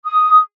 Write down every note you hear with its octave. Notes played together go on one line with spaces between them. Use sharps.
D#6